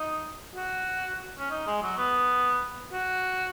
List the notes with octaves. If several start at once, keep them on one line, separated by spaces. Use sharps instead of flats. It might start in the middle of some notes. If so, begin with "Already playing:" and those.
Already playing: D#4
F#4
C#4
D#4
G#3
F#3
B3
F#4